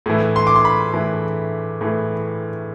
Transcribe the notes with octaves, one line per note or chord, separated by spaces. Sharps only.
A2 E3
C6
D6
C6
B5
A2 E3
A2 E3